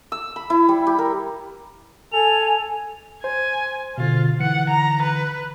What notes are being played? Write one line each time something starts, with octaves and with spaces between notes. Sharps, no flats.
E6
B5
E4
G3
G4
A#4
A4 G#5 F7
C5 G#5
B2 D3 F4
D3 E3 F#5 C#7
A#5
B4